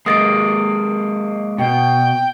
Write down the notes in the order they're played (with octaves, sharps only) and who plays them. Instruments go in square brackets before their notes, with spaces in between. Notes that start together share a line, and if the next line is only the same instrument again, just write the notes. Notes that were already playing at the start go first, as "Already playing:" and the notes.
[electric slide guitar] G#3 A#3 [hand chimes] D#6 A6 D7
[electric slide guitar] B2 [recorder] G5